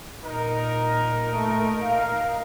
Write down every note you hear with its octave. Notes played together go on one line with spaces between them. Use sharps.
A#2 D#4 A#4
A3
F5